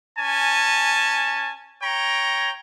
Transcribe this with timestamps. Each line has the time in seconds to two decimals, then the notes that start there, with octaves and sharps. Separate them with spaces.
0.18 C#4 G#5 A5
1.83 C#5 G5 A#5